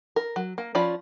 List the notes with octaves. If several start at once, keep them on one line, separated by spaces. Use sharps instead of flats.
A#4
F#3
A#3
F3 C#4 F4 D5 B5